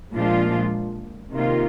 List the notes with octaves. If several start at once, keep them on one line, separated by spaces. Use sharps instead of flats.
A#2 F3 G#3 D4 F4
C3 D#3 A#3 F4